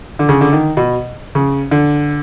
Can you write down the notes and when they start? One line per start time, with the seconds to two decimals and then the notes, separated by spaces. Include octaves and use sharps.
0.19 D3
0.29 C#3
0.41 D3
0.53 D#3
0.77 B2
1.35 C#3
1.71 D3